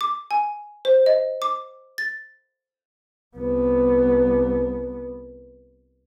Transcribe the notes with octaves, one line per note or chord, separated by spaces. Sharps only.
D6
G#5
C5
D#5
D6
A6
C2 B3